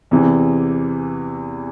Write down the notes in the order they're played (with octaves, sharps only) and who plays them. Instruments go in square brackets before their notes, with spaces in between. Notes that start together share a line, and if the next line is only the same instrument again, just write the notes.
[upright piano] E2 C3 E3